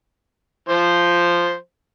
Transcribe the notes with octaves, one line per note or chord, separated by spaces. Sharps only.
F3 C5